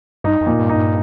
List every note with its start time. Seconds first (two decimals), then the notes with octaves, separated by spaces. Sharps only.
0.24 G2 D#4
0.41 F2
0.46 A#2
0.59 G2
0.69 D#4
0.75 G2